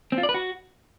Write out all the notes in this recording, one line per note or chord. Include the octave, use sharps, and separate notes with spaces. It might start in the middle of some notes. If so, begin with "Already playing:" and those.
C4
F4
D5
B4
F#4